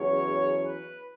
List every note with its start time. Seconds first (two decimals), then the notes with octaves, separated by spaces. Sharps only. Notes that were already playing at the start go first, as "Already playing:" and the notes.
Already playing: E2 C#3 F#3 C#5
0.65 B4